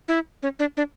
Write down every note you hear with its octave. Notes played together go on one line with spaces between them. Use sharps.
E4
C#4
D4
D4